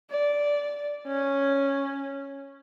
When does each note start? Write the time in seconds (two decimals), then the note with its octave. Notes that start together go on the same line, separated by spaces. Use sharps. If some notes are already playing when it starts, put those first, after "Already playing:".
0.11 D5
1.07 C#4